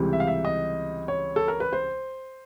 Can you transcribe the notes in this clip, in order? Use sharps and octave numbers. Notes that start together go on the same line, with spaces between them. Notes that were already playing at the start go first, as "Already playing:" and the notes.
Already playing: C#2 C3 E3 G3
E5
F5
E5
D#5
C#5
A4
A#4
B4
C5